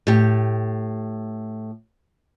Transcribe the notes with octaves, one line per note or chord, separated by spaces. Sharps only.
A2 G4